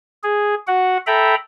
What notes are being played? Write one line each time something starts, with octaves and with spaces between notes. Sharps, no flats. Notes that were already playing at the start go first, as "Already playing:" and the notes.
G#4
F#4 F#5
A4 E5 G5 A#5 B5